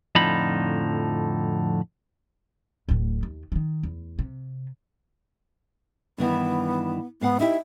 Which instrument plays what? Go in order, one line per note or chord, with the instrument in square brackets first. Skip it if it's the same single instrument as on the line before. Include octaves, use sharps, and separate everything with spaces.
[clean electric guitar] F2 A2 D3 F3 D#4 B5
[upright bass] D1 A2
D#2
D#3 E3
E2
C3
[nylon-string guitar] G2 D#3 E3 [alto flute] B3
[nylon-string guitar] G#2 F5 F#5 [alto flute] B3
[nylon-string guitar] D#4 E4 G4 [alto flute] E5